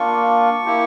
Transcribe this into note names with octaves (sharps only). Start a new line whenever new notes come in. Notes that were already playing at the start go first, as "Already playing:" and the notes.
Already playing: A#3 D4 F4 C#6
A#3 E4 G4